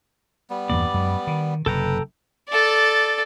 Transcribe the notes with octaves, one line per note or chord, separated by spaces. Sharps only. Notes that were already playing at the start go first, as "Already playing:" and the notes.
G3 B3
E2 G2 A#3 D5
F#2 G#3
D#3
F#1 C3 A4 B4 G5 A#5
A4 D5